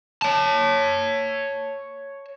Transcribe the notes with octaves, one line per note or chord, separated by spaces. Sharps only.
C#5 A5